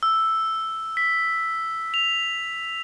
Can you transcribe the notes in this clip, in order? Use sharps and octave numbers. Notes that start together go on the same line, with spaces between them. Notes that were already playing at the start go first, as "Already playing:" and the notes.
E6
B6
F7